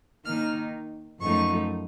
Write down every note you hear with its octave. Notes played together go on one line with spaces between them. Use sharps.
D#3 A#3 D#4 F6
F#2 F3 A3 D#4 C#6